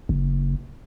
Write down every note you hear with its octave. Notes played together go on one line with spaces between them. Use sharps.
F#1